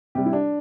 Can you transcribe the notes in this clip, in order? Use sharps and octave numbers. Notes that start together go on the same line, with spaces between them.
C3 G3 G4
E4
D4